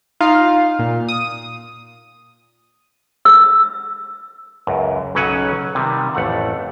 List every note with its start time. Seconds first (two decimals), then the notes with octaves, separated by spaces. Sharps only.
0.20 D#4 F4 F5
0.79 A#2
1.09 D#6
3.25 E6
4.67 C#2 F#2
5.15 B1 C#3 F#3 C#4 F#5 G#5
5.75 C3 D#3 G3
6.15 A1 F2 A3 F#5